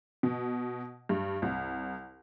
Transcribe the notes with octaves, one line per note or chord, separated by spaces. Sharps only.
B2
G2
C2